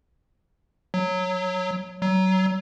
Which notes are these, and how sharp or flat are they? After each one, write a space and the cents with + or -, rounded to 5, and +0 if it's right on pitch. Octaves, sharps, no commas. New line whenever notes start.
F#3 -10
F#3 +25